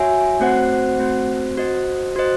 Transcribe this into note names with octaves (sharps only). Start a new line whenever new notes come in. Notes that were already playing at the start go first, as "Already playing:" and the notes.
Already playing: F#4 C#5 E5 G#5
A3 C4 F#4 C5 F#5
A3 C4 F#4 C5 F#5
F#4 C5 D#5
F#4 C5 D#5